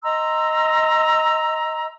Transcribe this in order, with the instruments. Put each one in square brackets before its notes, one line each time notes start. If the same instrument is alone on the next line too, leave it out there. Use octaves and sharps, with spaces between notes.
[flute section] D#5 A#5 C6 E6